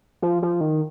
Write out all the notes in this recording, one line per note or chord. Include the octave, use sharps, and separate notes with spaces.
F3
F3
D#3